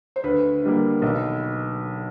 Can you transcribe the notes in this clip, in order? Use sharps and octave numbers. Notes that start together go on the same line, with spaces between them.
C5
D2 B4
D3 G3 A#3
B1